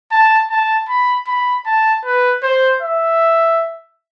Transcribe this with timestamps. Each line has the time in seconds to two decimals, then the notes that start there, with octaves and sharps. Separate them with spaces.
0.12 A5
0.51 A5
0.89 B5
1.28 B5
1.66 A5
2.05 B4
2.43 C5
2.82 E5